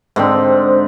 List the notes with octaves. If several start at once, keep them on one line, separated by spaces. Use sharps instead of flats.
G#2 D3 C4